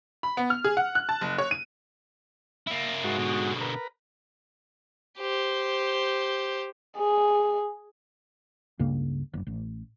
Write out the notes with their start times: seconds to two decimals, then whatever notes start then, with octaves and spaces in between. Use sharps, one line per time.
0.23 B5
0.37 B3
0.50 F6
0.64 G#4
0.77 F#5
0.95 F#6
1.09 A5
1.21 F#1
1.38 C#5
1.51 D#7
2.67 A#3 E4
3.04 G#2 F#4
3.17 B2 D3
3.60 A#4 B4
5.18 G4 C5
6.97 G#4
8.79 C#2 G2 C#3 A#3
9.34 F#1
9.47 A1